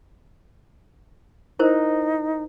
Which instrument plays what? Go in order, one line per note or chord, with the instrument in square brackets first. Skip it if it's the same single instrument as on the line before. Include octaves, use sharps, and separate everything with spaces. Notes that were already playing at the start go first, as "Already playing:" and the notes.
[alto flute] D#4 [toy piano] E4 A#4 C5